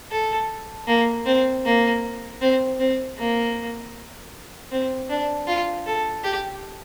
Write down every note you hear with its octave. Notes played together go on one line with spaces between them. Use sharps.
A4
A#3
C4
A#3
C4
C4
A#3
C4
D4
F4
A4
G4